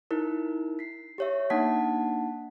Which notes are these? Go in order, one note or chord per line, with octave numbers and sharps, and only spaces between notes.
D#4 E4 A#4
B6 C7
G4 C#5 E5
A#3 D4 D#4 F#5 A5 B6